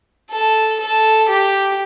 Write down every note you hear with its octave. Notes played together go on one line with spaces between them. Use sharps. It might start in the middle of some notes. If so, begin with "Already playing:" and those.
A4
A4
G4